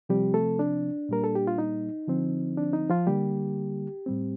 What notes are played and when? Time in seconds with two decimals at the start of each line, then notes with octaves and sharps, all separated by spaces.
0.09 C3 F3 G3 C4 G4
0.34 A3 A4
0.59 D4
1.09 A#2 G3 A#3 A#4
1.24 A4
1.35 G4
1.47 F4
1.58 D#4
2.07 D3 F3 C4
2.57 D4
2.73 D#4
2.90 F3 F4
3.07 D3 G3 A#3 G4
4.06 A2 G3 C4